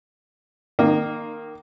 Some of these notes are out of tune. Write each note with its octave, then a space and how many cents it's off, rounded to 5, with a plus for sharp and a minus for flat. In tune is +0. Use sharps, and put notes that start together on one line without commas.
D#3 -15 A#3 +0 D#4 -45